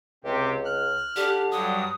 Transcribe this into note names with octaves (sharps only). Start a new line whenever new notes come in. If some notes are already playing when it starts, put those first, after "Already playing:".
C#2 C3 G4
F6 F#6
D3 G4
G2 F#3 D#6